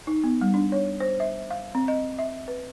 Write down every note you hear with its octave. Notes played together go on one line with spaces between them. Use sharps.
D#4
B3
G3
D4
C#5
C5
E5
F5
C4
D#5
E5
B4